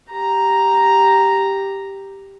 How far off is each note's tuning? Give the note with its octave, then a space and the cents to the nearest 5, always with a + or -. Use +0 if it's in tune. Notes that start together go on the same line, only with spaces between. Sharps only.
G4 +0 A#5 +0